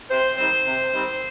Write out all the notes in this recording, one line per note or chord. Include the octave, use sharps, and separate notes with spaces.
C3 C5
D#3 G3 C4 C5
C3
D#3 G3 C4